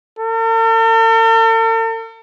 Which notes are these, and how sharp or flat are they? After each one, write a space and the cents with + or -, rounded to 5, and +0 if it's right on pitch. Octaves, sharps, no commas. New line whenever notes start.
A4 +45